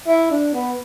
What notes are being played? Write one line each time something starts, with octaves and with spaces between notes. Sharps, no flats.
E4
D4
B3